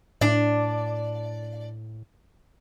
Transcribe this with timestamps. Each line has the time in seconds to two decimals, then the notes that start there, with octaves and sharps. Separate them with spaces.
0.21 A2 D4 D5